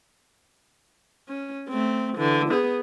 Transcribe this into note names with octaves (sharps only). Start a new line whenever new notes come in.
C#4
A3 C4
D3 E3
B3 G#4